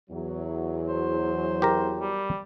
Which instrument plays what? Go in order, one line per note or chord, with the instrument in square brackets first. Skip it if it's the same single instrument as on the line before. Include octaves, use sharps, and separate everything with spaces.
[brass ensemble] E2 F#3
[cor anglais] C5
[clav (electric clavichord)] G4 A#4 A#5
[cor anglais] G3